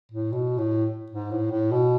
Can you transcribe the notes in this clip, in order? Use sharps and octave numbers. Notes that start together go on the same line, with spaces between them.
A2
B2
A2
G#2
A2
A2
B2